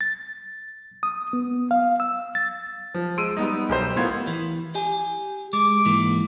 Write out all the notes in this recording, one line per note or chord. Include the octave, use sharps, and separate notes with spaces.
A6
D#6
B3
F5
E6
A6
F3
G#3 C6 E6 D7 D#7
G3 B3 D#4
B1 G4 C5
A2 B3 F4 A#4 C6 G#6
E3
G4 G#5
G#3 D6
G#2 E3 A#3